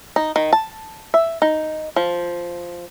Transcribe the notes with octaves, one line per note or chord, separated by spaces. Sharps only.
D#4
D#3
A5
E5
D#4
F3